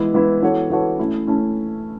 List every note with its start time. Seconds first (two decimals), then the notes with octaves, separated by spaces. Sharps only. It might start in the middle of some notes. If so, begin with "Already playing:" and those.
Already playing: E3 G#3 B3 E4
0.14 E3 G#3 B3 E4
0.42 E3 B3 F#4 A4 C#5
0.70 E3 B3 F#4 A4 C#5
0.99 A3 C#4 E4
1.27 A3 C#4 E4